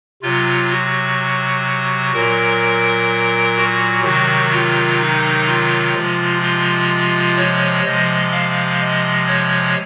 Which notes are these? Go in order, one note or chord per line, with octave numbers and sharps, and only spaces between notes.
C3 F#3 F4
F#4
A#2 F#3 A#4
F#4
C3 D#3 F#3 F#4
F4
D#4
F4
C3 F3 G#3
F4
C#5
C3 F3 G#3 D#5
F5
D#5
C#5